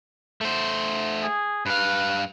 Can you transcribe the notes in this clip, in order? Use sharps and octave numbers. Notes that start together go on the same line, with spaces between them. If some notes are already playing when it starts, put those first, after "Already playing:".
A3 C5
G#4
G2 B4 F5